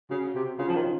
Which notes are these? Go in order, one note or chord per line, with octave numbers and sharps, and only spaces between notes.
C#3 F#4
C3
C#3 F4
F3
D#3
C#4